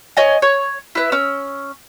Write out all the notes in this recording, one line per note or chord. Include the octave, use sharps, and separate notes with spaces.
C#5 D#5 G#5
C#5
E4 B4
C#4 E6